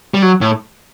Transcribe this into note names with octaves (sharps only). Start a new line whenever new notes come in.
G3
F#3
A2